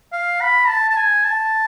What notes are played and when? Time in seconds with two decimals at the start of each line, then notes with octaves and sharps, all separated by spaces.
0.13 F5
0.41 B5
0.68 A5
0.90 A5
0.97 G#5
1.24 A5